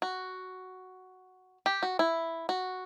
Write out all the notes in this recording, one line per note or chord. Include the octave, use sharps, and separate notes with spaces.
F#4
G4
F#4
E4
F#4